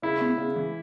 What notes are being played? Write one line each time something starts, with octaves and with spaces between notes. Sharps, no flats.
C#3 E4
B3
C#3
E3